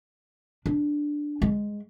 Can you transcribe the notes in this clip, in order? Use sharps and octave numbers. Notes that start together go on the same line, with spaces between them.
D4
G#3